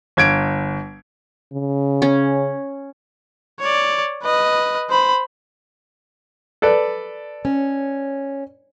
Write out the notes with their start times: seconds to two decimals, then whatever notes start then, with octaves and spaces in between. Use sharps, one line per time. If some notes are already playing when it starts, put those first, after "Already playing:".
0.17 G1 G#6 D7
1.53 C#3
2.02 C#4
3.60 C#5 D5
4.23 B4 D#5
4.90 C5 B5
6.62 A4 B4 D5
7.45 C#4